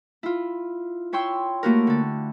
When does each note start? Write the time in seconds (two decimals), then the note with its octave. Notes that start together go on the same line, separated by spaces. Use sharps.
0.23 E4 F4
1.13 E4 C#5 G5 C6 E6
1.63 A3 A#3 E4 F#4 G4 A#4
1.87 D3 A4